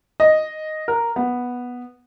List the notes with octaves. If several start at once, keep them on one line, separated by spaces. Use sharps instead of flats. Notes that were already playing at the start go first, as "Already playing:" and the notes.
D#5
A#4
B3